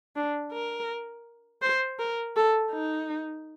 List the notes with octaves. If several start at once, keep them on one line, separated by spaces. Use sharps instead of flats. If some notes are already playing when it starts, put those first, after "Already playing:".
D4
A#4
C5
A#4
A4
D#4